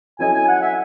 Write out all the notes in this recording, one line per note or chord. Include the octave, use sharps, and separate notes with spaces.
F#3 C#4 E4 A4 D#5 G#5
G#5
F#5
E5